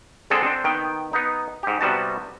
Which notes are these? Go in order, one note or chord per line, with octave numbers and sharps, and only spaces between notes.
D3 G#3 C4 G#4 A4
C4 D4 C5
D#3 B3 G5
B3 D#4
G#2 G4
C3 G3 B3 F#4 A5